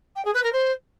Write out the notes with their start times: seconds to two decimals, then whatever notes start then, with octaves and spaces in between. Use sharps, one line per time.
0.15 G5
0.24 G#4
0.34 B4
0.43 A#4
0.52 C5